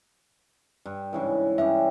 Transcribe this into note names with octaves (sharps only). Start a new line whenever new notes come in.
G2
G#2 C#3 E3
G2 C#3 G4 E5